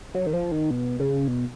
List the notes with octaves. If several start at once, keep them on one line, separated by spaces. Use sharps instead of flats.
F#3
D#3
F3
D#3
B2
C#3
B2